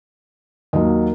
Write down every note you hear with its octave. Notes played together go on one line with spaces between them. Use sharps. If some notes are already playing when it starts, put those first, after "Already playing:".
D#2 D#3 F#3 A#3 D#5